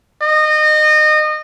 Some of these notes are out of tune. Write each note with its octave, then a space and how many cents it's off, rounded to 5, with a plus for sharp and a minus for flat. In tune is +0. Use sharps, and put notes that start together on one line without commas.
D#5 -25